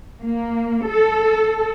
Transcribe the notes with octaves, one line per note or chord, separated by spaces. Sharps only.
A#3
A4